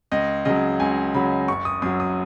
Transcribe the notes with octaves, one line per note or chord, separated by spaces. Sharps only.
C#2 D#5
C#3 F#3 D#5
C#2 G#5
C#3 F#3 B5
F#1 C#6
D#6
F#2 F#3 D#6
D#6